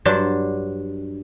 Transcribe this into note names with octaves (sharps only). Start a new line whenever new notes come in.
G2 F#3 D4 C5 A5